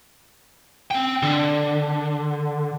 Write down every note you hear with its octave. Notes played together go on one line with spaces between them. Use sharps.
C4 G5
D3